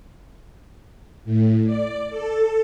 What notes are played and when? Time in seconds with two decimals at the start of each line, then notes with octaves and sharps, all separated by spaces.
1.25 A2
1.65 D5
2.10 A4